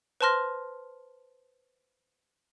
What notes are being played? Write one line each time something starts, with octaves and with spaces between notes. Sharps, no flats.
B4 C5 A5 C6 F6 A#6